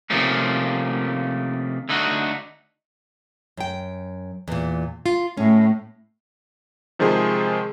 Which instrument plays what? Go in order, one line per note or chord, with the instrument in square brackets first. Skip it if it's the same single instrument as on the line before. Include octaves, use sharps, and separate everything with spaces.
[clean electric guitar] C3 D#3 F3 A3 A#3 C#4
D3 A3 D#4 F#4
[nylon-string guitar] F#2 G5
E2 A#2
F4
[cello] A2 [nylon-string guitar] C#4
[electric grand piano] C3 D#3 F3 G#3 G#4 C5